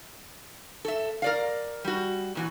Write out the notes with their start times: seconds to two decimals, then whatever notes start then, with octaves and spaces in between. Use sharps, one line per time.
0.85 A4 E5
1.22 A#4 D5 F5
1.85 G3 F#4
2.35 A#2 E3 F#4